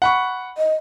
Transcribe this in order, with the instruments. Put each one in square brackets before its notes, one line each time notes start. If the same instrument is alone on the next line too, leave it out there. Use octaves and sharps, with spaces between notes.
[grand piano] F#5 B5 C#6
[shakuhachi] D#5